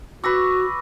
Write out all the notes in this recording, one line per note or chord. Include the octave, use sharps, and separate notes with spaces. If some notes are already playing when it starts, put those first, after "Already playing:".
F#4 B4 C#6 D6 E6 A#6